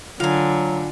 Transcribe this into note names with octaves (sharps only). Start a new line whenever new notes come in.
D3 F#3 F4 F5 G#5